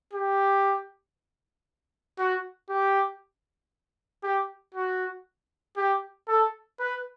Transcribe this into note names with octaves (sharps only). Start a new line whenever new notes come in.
G4
F#4
G4
G4
F#4
G4
A4
B4